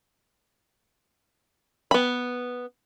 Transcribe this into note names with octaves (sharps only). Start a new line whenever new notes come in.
B3 B5